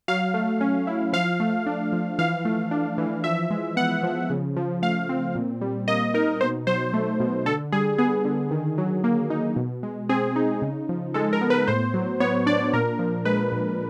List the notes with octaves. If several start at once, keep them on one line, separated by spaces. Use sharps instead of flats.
F#3 F5
A3
C#4
E4
F3 F5
A3
D4
F3
E3 F5
A3
D4
E3
F3 E5
G#3
B3 F#5
F3
C#3
F3
A3 F5
C4
A#2
G3
A#3 D#5
D#4 A#4
B2 C5
F#3 C5
A3
B2
D3 A4
G3 G#4
B3 G#4
D3
D#3
F#3
A#3
D#4
B2
G#3
C4 G#4
D#4
C#3
F3
G#3 A4
A#4
B3
B4
A2 C5
F#3
B3 C#5
D4 D5
A#2 A#4
F3
G#3 B4
A#2